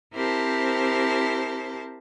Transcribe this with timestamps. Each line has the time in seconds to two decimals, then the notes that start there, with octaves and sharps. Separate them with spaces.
0.14 C4 E4 G4 A#4 C5 A5